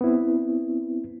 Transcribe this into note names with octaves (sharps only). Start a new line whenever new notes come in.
B3 C4 E4